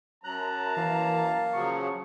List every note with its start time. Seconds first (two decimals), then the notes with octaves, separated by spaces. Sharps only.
0.24 F#2 F#3 A5 A#5 F#6
0.77 E3 A#3 F5
1.53 C#3 F3 F#3 C#6